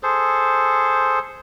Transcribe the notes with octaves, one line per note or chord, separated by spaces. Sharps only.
G#4 A4 C5